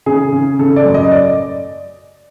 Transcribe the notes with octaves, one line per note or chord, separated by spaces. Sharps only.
C#3 G#4
C#3
C#3 A4
D5
F#2
D#5
D5